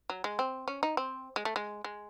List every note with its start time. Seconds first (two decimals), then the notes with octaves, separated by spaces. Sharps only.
0.10 F#3
0.24 G#3
0.39 C4
0.68 C#4
0.83 D#4
0.97 C4
1.36 G#3
1.45 A3
1.56 G#3
1.84 G#3